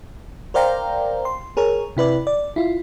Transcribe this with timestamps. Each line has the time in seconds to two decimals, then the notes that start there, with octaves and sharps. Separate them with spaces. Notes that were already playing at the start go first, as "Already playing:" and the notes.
0.54 A#4 C5 D5 F5 G5 A#5
1.25 C6
1.57 G#4 A#4 C#5
1.97 C3 E4 B4 D5
2.27 D5
2.56 E4 F4